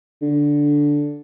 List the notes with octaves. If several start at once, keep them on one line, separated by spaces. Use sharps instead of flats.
D3